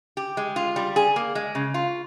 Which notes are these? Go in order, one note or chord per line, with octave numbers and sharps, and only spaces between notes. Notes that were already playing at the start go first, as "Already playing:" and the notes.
G4
G#3
F4
G3
G#4
A#3
G#3
C#3
F4